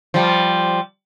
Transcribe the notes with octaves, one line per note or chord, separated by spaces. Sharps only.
F3 G3